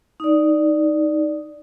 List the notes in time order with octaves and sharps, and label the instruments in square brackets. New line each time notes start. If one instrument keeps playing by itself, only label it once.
[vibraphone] D#4 D5